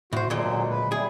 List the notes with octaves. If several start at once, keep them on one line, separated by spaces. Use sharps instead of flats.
A2 F#4 C5
D2 A#2 F#3 G#3
B4
G3 E4 G#4